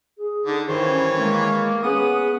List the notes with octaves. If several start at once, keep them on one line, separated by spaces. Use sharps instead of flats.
G#4
D3 D#4
G2 D#3 E3 C5 C#5
C#4
G#3 A#3
B3 C#4 G#4 D#6